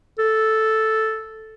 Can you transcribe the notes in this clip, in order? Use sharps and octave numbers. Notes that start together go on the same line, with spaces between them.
A4